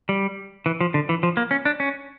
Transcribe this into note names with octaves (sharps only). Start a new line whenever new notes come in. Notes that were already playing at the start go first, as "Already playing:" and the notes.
G3
E3
F3
D3
E3
F3
A#3
C#4
D4
C#4